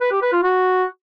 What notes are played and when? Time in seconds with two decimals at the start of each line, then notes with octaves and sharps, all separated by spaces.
0.01 B4
0.11 G4
0.22 B4
0.32 F4
0.43 F#4